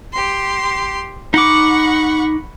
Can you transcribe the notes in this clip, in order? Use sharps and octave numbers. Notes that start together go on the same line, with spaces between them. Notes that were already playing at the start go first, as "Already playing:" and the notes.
G4 C6
D#4 F#5 B5 C#6 D6